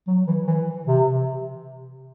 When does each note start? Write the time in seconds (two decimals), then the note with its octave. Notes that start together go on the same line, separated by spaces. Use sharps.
0.07 F#3
0.27 E3
0.47 E3
0.87 C3